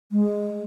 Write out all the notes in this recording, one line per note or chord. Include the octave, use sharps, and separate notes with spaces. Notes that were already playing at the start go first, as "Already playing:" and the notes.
G#3